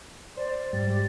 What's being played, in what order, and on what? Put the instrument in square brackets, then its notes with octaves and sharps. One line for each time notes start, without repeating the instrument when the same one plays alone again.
[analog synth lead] C5 [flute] D5
[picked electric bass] G#2 [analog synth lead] G3 [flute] A6
[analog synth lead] G4